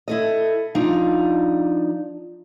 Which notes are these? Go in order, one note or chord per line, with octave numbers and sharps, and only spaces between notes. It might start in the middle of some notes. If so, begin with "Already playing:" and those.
E4 A4 D#5
F3 D4 D#4